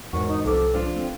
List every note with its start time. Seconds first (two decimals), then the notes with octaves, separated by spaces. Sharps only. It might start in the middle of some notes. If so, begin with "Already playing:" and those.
0.13 E2 G#2 D#3 F#4 C#5 C#6
0.28 D#4
0.45 C2 C3 F3 A4 D6
0.74 F3 D4 F4
0.96 A3 C4